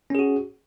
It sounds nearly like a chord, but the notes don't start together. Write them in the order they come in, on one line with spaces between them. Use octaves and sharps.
C#4 G#4 F#4